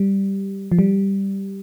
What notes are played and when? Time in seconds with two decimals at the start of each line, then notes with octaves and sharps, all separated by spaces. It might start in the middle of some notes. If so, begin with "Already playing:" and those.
Already playing: G3
0.72 F3
0.79 G3